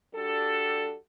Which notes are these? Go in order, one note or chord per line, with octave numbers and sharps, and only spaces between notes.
G3 D4 F#4 G4 A4